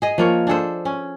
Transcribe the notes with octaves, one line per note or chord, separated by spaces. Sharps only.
G#4 D#5
F3 A#3 C#5
D4 G#4 A4 C5
C#4